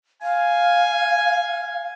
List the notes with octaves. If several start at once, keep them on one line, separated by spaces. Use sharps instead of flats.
F5 G#5